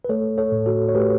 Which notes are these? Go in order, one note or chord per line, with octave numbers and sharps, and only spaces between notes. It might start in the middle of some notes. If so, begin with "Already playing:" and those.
B4
A3 A4 C#5
A4 C#5
A2
F#4 A4
C#5
A3 G4 B4